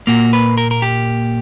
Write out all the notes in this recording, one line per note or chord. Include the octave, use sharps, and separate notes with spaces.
A#2 A#3 F#4
B4
A#4
A#4
G4